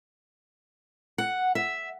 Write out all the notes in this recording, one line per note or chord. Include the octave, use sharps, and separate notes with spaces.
F#5
E5